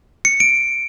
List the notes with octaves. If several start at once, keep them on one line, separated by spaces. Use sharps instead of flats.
C#7
D7